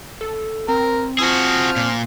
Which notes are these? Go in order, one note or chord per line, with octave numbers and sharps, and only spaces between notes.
A4
C4 A#4
F3 F#4 G#4 F6
A#2